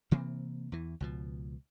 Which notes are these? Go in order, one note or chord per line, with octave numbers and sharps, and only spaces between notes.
C3 E3 A#3 C4
E2 E3
C#2 B2 F3